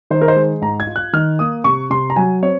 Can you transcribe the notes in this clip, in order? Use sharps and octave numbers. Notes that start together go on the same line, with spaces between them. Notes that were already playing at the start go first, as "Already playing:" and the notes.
D#3 C5
A#4
C5
G#3
G#2 A#5
G#6
F4
F#6
D#3 F6
A#3 D#6
C3 C#6
C3 C6
A#5
F#3 G#5
C4 C#5